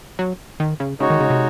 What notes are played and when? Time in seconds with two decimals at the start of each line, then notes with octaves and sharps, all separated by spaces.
0.19 F#3
0.60 D#3
0.80 C#3
1.00 C#3 G#3 D#4 F#4 C#5
1.10 D#3
1.21 C#3
1.30 C3